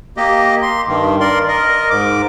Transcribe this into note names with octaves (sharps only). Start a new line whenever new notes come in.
A#3 G4 D#5
C6
G2 D#3
A#4 D5 C6
A#4 D#5
G#2 D6